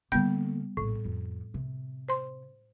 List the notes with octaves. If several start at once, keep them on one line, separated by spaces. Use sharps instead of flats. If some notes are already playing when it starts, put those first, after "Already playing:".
D3 G3 A#3 B3 G6
A#1 A2
F2
C3
C5 C6